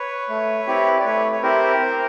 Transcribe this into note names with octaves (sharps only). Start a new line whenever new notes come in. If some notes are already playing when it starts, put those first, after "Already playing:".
Already playing: B4 C#5
A3
C4 E4 G4
D5
A3 B4 C#5
C#5
C4 E4 G4 A#4 C5
C4